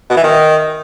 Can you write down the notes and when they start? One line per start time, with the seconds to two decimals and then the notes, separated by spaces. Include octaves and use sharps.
0.09 B2
0.16 E3
0.23 D#3